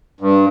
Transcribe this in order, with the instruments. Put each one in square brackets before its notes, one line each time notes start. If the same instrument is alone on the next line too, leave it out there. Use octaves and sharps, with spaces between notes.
[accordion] G2